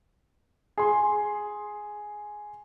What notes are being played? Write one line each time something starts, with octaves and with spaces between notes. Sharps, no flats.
G#4 C6